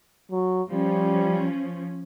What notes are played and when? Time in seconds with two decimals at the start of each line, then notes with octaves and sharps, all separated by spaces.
0.31 F#3
0.71 F3 G3 C#4